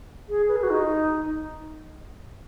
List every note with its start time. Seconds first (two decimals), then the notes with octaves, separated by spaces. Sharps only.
0.29 G#4
0.48 B4
0.56 G#4
0.63 F#4
0.70 D#4